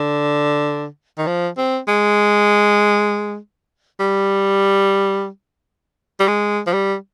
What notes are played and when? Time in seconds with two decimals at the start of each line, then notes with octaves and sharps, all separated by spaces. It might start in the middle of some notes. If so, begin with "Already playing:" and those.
Already playing: D3
1.18 D#3
1.27 F3
1.57 C4
1.88 G#3
4.00 G3
6.20 G3
6.28 G#3
6.67 F3
6.73 G3